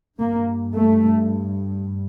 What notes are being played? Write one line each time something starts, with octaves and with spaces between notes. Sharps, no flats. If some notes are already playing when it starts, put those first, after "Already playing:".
G2 A#3
A3